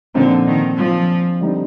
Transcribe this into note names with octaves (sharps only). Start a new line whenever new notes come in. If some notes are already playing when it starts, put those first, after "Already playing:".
A#2 D3 F3 C4 D#4
D#3
F3
D3 G3 C4 D#4